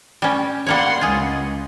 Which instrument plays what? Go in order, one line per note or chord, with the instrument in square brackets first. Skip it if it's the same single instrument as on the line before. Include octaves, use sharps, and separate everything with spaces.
[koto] G3 C#4
[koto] G3 A#3 C#5 [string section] F#5 C6
[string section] C#2 [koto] F4 G#4